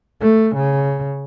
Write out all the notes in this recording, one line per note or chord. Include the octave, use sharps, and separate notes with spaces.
A3
C#3